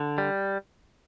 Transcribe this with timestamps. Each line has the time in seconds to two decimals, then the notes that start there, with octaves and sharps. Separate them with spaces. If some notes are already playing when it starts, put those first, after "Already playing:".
Already playing: D3
0.18 G3